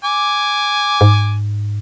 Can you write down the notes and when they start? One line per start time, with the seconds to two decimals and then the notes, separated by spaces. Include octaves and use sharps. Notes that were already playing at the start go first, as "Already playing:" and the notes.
0.05 G#5 D6
1.01 G#2